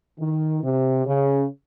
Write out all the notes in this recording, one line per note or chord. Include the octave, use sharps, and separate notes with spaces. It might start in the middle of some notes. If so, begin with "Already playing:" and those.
D#3
C3
C#3